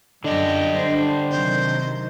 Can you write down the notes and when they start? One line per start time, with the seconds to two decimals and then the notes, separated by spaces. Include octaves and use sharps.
0.24 F#2 D3 D4 G4 D#5
0.77 C5
1.30 C3 D#3 F#3 C5